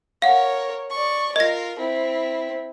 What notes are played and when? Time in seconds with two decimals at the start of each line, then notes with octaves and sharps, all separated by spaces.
0.22 A#4 C#5 F5 F#5
0.90 D5 C#6
1.36 F4 A#4 D#5 A#6
1.78 C4 E4